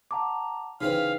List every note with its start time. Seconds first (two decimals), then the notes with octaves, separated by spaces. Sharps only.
0.11 F#5 A5 A#5 D6
0.81 C#3 E3 C4 D#4 F5 B6